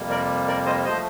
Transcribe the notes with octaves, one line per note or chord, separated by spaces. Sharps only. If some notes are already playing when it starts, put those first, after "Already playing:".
Already playing: F2 C3 G3 A#3
A#4 D5
A#4 D5
C5 D#5
F3 A3 C5 D#5